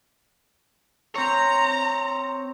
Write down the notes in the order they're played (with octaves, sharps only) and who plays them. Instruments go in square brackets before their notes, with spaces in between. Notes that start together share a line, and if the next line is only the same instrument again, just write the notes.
[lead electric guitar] C4 C#5 [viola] A#5